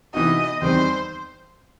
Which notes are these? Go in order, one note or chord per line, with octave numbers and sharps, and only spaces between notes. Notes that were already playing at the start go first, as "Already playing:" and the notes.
C3 E3 B3 D#4 F#4 D#5
E2 D#3 G3 C4 D#4 C5